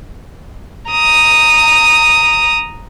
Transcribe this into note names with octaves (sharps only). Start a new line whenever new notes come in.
A#5 D#6